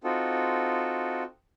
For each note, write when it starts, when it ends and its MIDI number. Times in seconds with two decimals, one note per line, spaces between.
0.04 1.23 60
0.04 1.23 63
0.04 1.23 65
0.04 1.23 66
0.04 1.23 69